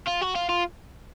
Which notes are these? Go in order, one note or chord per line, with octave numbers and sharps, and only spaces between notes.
F4
F#4
F4
F4